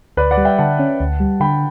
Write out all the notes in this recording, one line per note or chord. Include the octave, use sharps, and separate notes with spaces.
D2 B4 D5
D5 F#5
G3
E5 G5
D3 F#5 A5
C#4
D2
G3
D3 G5 B5